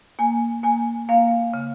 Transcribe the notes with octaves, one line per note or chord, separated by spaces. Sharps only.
A#3 G#5
A#3 G#5
A#3 F5
C#3